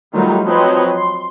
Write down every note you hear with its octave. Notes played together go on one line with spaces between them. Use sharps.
D#3 F#3 G3 A3 D#4 F4
F3 F#3 C4 B4 C#5 D#5
C6